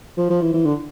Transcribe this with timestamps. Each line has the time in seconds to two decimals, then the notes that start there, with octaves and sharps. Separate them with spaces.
0.18 F3
0.30 F3
0.41 E3
0.53 E3
0.65 D3